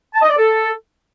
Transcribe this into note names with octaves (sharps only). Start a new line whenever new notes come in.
A5
D#5
D5
A4